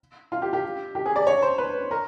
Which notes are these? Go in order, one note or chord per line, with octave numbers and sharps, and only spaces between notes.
F4
G4
G4
G4
G#4
D5
C#5
C5
B4
A#4